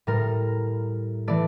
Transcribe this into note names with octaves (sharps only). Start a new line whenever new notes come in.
A2 G3 A#4
E3 A3 D5